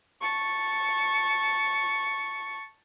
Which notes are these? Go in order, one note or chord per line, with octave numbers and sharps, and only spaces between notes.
A5 C#6